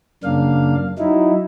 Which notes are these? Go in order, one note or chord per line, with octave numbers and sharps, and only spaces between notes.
F#2 C#3 A#3 D4 F5
F#3 D#4 E4